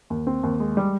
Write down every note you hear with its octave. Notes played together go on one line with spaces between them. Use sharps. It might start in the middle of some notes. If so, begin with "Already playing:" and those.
D#2
C4
D#2
G#3
G3